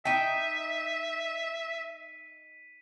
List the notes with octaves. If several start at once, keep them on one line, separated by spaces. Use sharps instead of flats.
D#4 E5 G5 B6 D#7